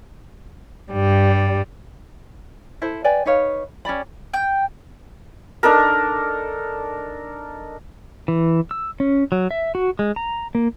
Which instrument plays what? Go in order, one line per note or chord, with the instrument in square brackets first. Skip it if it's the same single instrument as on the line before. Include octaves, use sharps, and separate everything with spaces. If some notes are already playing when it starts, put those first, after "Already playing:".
[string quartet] G2 G3
[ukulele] E4 A4 C5
B4 D5 G5 G#5
D#4 B4 C#5 F5
C#4 G4 D5 B5
[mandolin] G5
[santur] D4 D#4 A4 A#4
[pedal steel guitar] E3
E6
C#4
F#3
E5
F#4
G#3
A#5
A#3